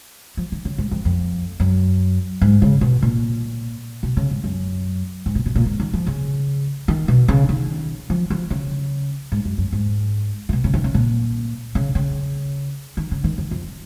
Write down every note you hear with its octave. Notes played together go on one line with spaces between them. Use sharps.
F3
D#3
C#3
G#2
F2
F2
F#2
G#2
C#3
B2
A#2
B2
C#3
G#2
F#2
G#2
A#2
B2
A#2
G#2
D#3
F3
C#3
D#3
B2
C#3
D#3
F3
F3
C#3
G#2
F#2
F#2
G#2
A#2
B2
C#3
D#3
C#3
A#2
C#3
C#3
D#3
C#3
D#3
D#3
F2